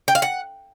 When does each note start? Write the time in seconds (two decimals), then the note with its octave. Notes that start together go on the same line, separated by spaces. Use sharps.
0.08 G5
0.15 F5
0.22 F#5